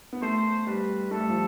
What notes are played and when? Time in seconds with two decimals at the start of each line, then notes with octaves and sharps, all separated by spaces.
0.13 B3
0.22 A3 C5
0.67 G3 B4
1.11 A3 A4
1.21 G3
1.30 F3